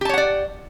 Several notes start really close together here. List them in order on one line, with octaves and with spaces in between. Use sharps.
G4 A5 C#5 F#5 D5